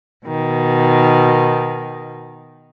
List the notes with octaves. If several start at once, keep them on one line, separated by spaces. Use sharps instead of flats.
B2 D#3